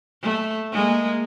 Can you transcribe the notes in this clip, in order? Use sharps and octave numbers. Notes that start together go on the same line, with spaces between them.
A3
G#3 A#3